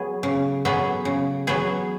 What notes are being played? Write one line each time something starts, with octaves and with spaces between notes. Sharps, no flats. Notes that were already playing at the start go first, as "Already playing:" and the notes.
Already playing: F#3 B3 G#4
C#3
F#3 B3 G#4
C#3
F#3 B3 G#4